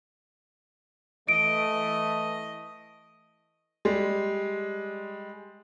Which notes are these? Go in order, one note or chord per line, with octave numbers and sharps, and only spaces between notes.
E3 A3 D#5 D7
G3 G#3